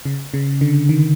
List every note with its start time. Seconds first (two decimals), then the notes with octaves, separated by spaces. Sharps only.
0.05 C#3
0.34 C#3
0.61 D3
0.89 D#3